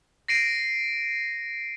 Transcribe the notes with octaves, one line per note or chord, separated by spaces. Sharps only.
A#6 C7 D7 D#7